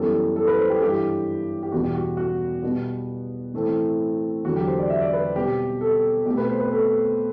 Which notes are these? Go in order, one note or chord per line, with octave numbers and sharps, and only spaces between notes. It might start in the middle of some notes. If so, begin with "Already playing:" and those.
Already playing: F#2 E3 G3 B3 A4
A4
B4
C5
G4
A4
G2 E3 G3 G4
G4
E2 B2 G3 B3 F#4
G4
F#4
F#4
B2 G3 B3
A2 E3 A3 C4
E2 D3 F#3 F#4
G4
C5
D5
E5
D5
B4
B2 G3 C4 G4
A4
B2 A3 C4 G4
B4
C5
B4
A4